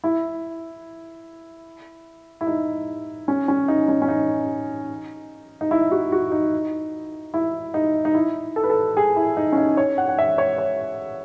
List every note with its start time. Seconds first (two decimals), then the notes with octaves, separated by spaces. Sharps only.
0.04 E4
2.41 E4
2.47 D#4
3.28 C#4
3.48 C#4
3.68 D#4
3.88 C#4
4.02 C#4
4.08 D#4
5.61 D#4
5.71 E4
5.91 F#4
6.12 F#4
6.32 D#4
7.34 E4
7.74 D#4
8.05 D#4
8.14 E4
8.56 A4
8.64 B4
8.70 A4
8.97 G#4
9.16 E4
9.37 D#4
9.53 C#4
9.58 D#4
9.77 C#5
9.98 F#5
10.09 F#5
10.19 E5
10.38 C#5
10.58 C#5